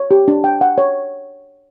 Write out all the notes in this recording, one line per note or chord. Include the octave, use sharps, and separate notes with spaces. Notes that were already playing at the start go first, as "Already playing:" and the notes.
Already playing: C#5
G4
D4
G5
F#5
C#5